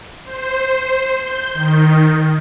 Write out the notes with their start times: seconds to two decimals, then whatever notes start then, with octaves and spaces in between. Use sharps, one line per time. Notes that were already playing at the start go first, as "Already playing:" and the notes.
0.24 C5
1.15 G6
1.53 D#3